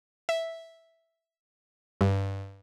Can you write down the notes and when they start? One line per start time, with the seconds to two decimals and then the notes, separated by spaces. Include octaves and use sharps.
0.29 E5
2.01 G2